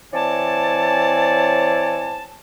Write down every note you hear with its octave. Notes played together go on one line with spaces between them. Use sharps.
E3 C4 C#5 D5 G#5 A5